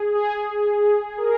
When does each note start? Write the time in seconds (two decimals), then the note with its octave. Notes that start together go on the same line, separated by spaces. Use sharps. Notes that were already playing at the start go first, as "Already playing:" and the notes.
Already playing: G#4
0.15 G#4
1.18 A#4